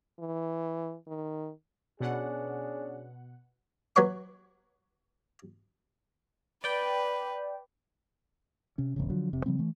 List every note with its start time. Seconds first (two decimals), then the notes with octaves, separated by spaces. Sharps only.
0.19 E3
1.07 D#3
2.01 B2 C#4 D4 G#4 F#5
3.96 F#3 B4 C#5 C#6 D6
6.64 B4 D5 G5
8.78 C3 C#4
8.96 E1 A1 C#3
9.10 D3 F3 F#3
9.33 F1 C3
9.46 C#3 F3 G3 C4
9.59 E3 A3